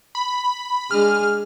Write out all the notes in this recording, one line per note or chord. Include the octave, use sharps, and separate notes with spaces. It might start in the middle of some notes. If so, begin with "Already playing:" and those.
B5
G#3 D4 G#4 F6